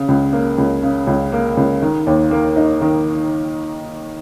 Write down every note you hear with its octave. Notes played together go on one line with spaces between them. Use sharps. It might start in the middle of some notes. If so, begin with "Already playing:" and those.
Already playing: C#3
C#2
A#3
C#2
C#3
C#2
A#3
C#2
D#3
D#2
A#3
D#4
D#3